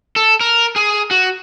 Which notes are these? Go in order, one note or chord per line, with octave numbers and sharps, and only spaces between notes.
A4
A#4
G#4
F#4